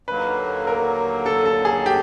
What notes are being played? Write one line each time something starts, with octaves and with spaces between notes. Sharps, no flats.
D#2 D3 F#3 A#3 B4
A#4
A4
A4
G#4
G4